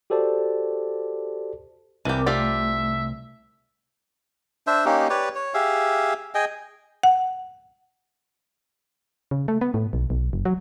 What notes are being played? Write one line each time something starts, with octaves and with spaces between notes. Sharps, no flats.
F#4 G4 A4 C5 D5 A5
C2 E3 C4 G4 A#4 D6
A3 F4 G4 D5 E5
D4 C5 E5
A#3 C#4 D#4 G4
G4 B4 C#5 D5
C#5
G4 G#4 E5 F5
G#4 D#5 G5 G#5
F#5
C#3
A3
B3
A2
B1
B1
F#1
F#3